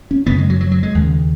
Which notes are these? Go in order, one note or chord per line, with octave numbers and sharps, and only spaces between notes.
C#4
F#2 C#3 B3
G#3
F#3
F#3
F#3
G#3
D#2 C#3